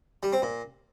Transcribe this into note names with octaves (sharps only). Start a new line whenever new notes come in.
G3
C4
A#2